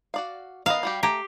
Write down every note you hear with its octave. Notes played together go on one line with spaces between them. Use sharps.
F#4 D5 F5
D#3 B3 D#5 F5
G3 F#4 G4
A3 G4 G#5 A#5